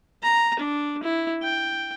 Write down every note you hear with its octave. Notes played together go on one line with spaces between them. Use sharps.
A#5
D4
E4
G5